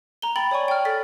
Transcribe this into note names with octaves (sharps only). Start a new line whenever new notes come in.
A#5 G7
G5 B5 A6 F#7
C#5 D5 G#5 C#6
G5 F6
A4 A6 B6